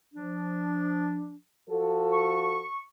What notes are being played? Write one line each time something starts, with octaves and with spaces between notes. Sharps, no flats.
F3 D4
F3 F#4 A4
C#6